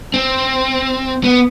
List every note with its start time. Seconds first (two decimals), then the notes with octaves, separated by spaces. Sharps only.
0.14 C4
1.24 B3